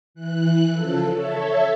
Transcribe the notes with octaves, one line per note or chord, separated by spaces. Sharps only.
E3 F#6
C#3 F3 A4
A4 C#5 E5